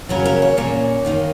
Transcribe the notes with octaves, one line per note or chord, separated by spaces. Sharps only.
C#3 F#3 A#3 C#4 A#4
A#4
C#5
A#2 A#3 C#4
D#3 A#3 D#4